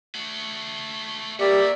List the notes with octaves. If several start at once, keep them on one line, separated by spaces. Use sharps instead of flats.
A3 F#4
A#3 F#4 G4 B4 D5 E5